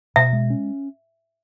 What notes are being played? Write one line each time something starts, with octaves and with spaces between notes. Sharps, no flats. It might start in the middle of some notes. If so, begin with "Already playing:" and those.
B2 E5
G#3
C#4